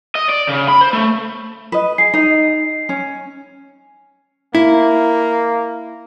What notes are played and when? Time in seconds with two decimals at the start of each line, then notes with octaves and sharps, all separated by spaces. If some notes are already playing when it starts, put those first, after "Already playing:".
0.16 D#5
0.29 D5
0.49 C#3
0.68 B5
0.81 C5
0.93 A3
1.72 B4 D#5
1.98 G#4 C7
2.14 D#4 D#5
2.89 C#4
4.55 A#3 E4